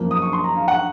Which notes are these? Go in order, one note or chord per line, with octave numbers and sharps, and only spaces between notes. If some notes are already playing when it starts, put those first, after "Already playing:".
Already playing: F#2 F3 A#3
D#6
C#6
C6
A#5
F5
F#5